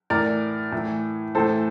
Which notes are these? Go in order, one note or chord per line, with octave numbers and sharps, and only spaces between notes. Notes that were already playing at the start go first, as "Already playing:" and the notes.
A2 E3 A#4 D5
A2 E3
A2 E3 A4 C5